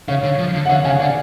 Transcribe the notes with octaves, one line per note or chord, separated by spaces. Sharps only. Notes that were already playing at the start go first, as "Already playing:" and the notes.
C#3 C#5 F5
D3
F3
D3
F#5
D3 C#5 F5
C#3 F5 G#5
D3 D5 F#5